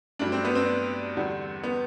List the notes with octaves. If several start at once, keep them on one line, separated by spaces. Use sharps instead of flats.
G2 F#3 A3 D4
C4
B3
C4
E2 D3 G3
B3